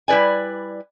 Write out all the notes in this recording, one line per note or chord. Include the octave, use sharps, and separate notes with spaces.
G3 E4 B4 D5 G#5